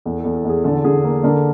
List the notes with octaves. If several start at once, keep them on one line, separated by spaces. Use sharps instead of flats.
E2 A4
E2 A4
A4
E2 G#4
D3 A4
D3 G#4
A#3 A4
D3 A#4